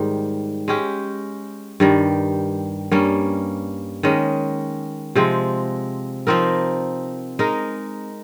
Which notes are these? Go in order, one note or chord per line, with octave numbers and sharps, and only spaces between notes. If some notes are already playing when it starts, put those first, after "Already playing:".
Already playing: G#2 D#3 G3
G#3 C#4 G4
G2 D#3 G3
G2 G3 A#3 C#4
D#3 G#3 C#4
C3 F3 G#3 C4
F3 C4 D#4 A#4
G#3 D#4 A#4